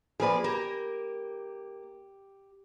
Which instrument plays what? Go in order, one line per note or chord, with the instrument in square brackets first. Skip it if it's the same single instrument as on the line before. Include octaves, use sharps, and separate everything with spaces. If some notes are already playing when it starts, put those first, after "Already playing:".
[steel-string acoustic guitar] F3 A#3 D5 [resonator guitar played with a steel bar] G#4 B4
[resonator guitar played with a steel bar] A#3 [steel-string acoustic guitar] G4